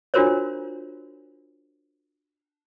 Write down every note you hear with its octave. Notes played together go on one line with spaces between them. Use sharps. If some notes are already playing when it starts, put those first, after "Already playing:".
D4 F4 F#4 A#4 C5 C#5